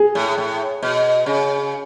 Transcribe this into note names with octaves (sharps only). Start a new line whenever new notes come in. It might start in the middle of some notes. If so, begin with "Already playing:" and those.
Already playing: G#4
A2
A2
B2
C#3